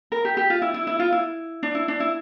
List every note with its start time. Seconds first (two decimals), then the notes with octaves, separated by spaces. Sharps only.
0.12 A#4
0.25 G4
0.37 G4
0.50 F4
0.62 E4
0.74 E4
0.87 E4
0.99 F4
1.12 E4
1.63 D4
1.75 E4
1.88 D4
2.00 E4